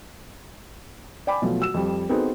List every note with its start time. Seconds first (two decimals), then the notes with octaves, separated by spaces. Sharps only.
1.27 D5 G5 G#5 B5 D6
1.42 B2 F3 F#3 A3
1.60 F#4 E6 E7
1.74 F2 G3
2.09 B3 C4 D#4 F#4 G#4 A4